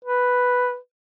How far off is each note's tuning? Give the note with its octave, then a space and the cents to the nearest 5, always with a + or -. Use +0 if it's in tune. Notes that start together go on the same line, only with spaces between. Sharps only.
B4 +0